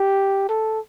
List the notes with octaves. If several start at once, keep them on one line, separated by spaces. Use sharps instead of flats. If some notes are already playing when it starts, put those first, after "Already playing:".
Already playing: G4
A4